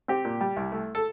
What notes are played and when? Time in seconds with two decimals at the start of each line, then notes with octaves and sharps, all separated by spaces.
0.08 C4 G4
0.25 A#2
0.41 G3
0.57 C2
0.72 A3
0.95 A4